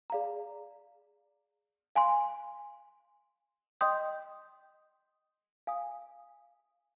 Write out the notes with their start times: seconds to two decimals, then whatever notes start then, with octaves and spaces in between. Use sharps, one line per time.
0.10 G#4 D5 F5 A#5
1.96 F5 G#5 C6
3.81 D#5 G5 C6 D#6 G6
5.67 F5 G#5 D#6